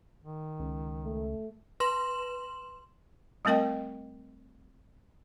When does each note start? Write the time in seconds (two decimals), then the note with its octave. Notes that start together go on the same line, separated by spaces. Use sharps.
0.24 D#3
0.60 C#2
1.05 A3
1.80 B4 C6 E7 F#7
3.45 G3 A3 C4 A#4 D#5 G5